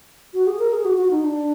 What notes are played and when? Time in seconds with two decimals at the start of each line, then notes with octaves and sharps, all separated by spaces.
0.34 F#4
0.47 G#4
0.59 A#4
0.73 G#4
0.85 F#4
0.98 F#4
1.11 D#4
1.24 D4